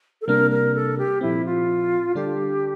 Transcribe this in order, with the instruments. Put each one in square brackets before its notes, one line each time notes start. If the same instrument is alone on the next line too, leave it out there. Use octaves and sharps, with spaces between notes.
[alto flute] A4
[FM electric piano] C3 G3 A#3 D4 [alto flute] A#4
[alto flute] A#4
A4
G4
[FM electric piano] A#2 F3 C4 [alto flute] E4
[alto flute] F4
[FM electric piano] D3 G3 D4 A4 [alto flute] G4